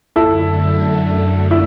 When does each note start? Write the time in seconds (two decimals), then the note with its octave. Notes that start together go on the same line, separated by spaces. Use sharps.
0.15 F#2 D3 A3 E4 A4
1.51 E4